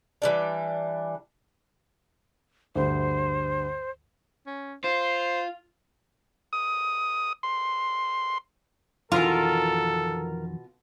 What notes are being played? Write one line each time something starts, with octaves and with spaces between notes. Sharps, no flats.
E3 G3 D4
D2 G2 C5
C#4
F4 C5
D#6
C6
F2 B2 D#3 E3 F4 A4 A#4